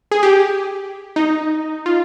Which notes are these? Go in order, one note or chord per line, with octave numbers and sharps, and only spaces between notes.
G#4
G4
D#4
F4